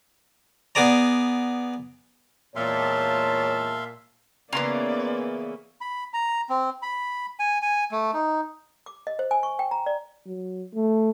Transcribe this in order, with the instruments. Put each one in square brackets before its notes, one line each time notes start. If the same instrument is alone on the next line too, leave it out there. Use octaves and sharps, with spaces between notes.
[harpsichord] B3 G#4 D5 A#5
[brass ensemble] E2 G#3 A5 [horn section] A#2 [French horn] C#5 [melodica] E5 F5 C6
[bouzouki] C#3 E3 [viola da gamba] A#3 B3 [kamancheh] D5 [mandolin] A#5 C6
[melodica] B5
A#5
C4
B5
G#5
G#5
A3
D#4
[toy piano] D6
D#5
C5
G#5
C#6
G5
A#5
D5
[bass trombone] F#3
A3